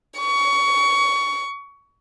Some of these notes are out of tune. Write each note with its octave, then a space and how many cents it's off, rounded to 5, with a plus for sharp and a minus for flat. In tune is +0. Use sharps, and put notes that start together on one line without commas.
C#6 +20